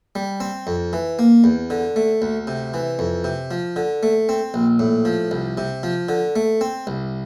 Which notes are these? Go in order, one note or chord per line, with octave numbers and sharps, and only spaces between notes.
G3
C4
F2
E3
A#3
E2
D3
A3
D2
C3
E3
F2
C3
F3
D3
A3
C4
A#1
A2
F3
C2
C3
F3
D3
A3
C4
C2